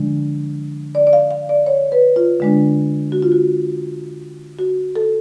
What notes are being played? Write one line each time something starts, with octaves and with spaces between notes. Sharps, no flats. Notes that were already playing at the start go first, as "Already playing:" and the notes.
Already playing: D3 F3 G#3 D4
D5
D5
F5
F5
D5
C#5
B4
F4
D3 G#3 D4
F#4
F4
F#4
F#4
A4